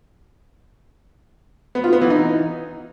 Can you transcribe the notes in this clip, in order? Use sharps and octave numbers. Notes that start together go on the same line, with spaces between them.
B3
F4
B3
E3
D#4